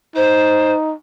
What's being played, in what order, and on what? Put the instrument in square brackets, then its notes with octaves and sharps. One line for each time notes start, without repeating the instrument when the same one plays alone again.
[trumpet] D#4 [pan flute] C5